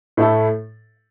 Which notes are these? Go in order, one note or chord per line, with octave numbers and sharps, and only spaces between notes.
A2 A3 E4 A4